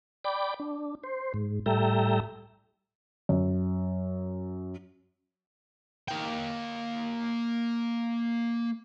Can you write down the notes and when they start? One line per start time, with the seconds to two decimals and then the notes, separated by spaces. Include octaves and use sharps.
0.25 D5 G5 B5 D6
0.60 D4
1.04 C5
1.34 G#2
1.66 A2 G3 A4 E5 G5 A#5
3.29 F#2
6.08 A#3 G5